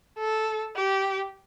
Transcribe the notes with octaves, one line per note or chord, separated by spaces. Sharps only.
A4
G4